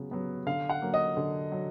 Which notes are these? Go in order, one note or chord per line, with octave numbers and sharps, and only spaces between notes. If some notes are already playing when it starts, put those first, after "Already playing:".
Already playing: C#3 F#3 B3
F#3 B3
D3 F5
F#5
F#3 A#3
D#5
D3
F#3